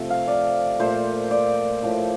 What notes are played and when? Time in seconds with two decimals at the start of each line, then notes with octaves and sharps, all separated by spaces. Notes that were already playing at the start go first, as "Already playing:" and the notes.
Already playing: C3 F3 A3
0.10 F5
0.28 D5
0.79 A#2 A3 C5
1.31 D5
1.82 A2 F3 A3